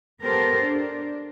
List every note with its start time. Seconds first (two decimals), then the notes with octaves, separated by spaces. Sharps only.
0.22 B3 G4 A4 A#4 C5
0.61 D4